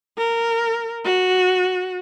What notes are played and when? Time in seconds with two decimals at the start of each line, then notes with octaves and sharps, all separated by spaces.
0.18 A#4
1.05 F#4